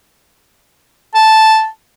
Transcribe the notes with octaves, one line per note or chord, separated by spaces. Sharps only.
A5